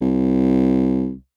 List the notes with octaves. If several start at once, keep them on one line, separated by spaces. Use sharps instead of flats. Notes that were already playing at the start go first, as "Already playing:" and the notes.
C2